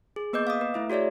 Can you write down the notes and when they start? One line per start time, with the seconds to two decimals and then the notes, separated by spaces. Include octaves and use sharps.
0.16 G#4
0.33 A#3 B3 B4 D#5 D6 G6
0.47 F5 D6 D#6
0.61 B4
0.74 A3 E4 E5
0.90 F#4 G#4 C#5 D5 E5